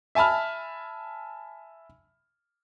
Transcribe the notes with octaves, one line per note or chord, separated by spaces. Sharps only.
E5 G#5 A5 B5 F6